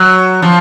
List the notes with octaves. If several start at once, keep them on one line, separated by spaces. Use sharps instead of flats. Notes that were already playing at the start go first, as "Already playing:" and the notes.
Already playing: F#3
F3